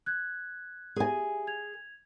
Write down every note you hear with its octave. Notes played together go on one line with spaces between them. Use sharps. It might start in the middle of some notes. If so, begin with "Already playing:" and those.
F#6 G#6
G4 G#4 E5 G#5
G#6 F7